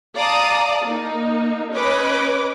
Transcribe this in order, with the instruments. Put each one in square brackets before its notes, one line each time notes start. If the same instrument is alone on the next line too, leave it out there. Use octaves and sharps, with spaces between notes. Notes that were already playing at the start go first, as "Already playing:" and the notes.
[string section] D5 F5 A5 A#5 D#6
A#3 D#4
C#4 B4 C#5 D#5 D6